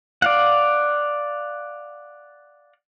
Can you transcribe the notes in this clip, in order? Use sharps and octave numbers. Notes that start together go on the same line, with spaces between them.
D5 F5 F#5